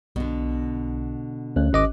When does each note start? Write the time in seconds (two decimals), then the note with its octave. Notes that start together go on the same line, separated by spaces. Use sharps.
0.16 B1 B2 D3
1.56 D2 C#4 F#6
1.73 G#1 D#5 D6